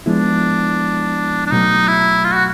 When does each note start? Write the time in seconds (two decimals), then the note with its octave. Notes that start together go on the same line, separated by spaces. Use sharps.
0.06 F3 G#3 B3 D4 E4
1.47 D4
1.52 B2 F#3 A3 D#4
1.88 E4
2.24 F4
2.35 F#4